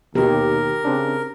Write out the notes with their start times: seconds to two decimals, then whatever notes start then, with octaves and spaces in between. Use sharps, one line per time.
0.15 D#2 B2 D#3 G4 A#4
0.85 C#3 C4 D4